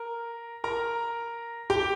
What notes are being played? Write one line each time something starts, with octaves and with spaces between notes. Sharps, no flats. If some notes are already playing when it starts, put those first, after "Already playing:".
Already playing: A#4
A#4 A#5
G4 G5